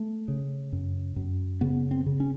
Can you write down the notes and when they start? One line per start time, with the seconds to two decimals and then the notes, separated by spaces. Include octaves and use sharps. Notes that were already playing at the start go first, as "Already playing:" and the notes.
Already playing: A3
0.28 C#3
0.72 F#2
1.16 F#2
1.61 C#3 B3
1.91 C4
2.06 C#3
2.20 C#4